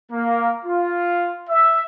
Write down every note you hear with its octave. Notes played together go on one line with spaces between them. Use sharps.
A#3
F4
E5